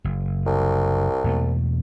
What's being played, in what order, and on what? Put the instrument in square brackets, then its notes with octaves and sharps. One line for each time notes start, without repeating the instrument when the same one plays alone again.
[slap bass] F#1
[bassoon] C2
[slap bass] E2 B2 A3